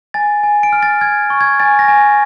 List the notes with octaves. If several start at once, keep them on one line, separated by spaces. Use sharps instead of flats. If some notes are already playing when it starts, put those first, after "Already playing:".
G#5 A6
G#5
D7
F6
A6
F6 G#6
C#6
G#6
G#5 A6
A#6
G#5